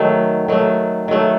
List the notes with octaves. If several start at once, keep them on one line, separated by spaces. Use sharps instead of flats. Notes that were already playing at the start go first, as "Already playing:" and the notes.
Already playing: D#3 F#3 A3
D#3 F#3 A3
D#3 F#3 A3